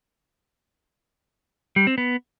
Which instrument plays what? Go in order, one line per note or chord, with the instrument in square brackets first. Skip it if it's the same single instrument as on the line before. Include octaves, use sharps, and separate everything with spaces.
[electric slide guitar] G3
C4
B3